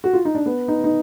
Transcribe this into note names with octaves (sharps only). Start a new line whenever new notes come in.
F#4
F4
D#4
D4
B3
D#4
D#4